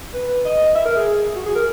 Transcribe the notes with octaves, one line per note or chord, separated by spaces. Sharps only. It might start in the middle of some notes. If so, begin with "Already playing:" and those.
B4
D#5
E5
A#4
G#4
F#4
G#4
A#4